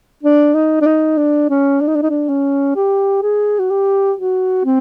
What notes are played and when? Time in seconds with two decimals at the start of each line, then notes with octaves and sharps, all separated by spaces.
0.23 D4
0.55 D#4
0.81 D4
0.86 D#4
1.18 D4
1.50 C#4
1.81 D4
1.88 D#4
1.95 D4
2.03 D#4
2.10 D4
2.29 C#4
2.76 G4
3.22 G#4
3.60 F#4
3.70 G4
4.18 F#4
4.65 C4